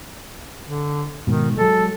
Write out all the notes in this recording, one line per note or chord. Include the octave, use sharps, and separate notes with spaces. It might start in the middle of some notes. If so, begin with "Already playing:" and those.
D3
G#2 B2 D#3
F#3 G#3 A4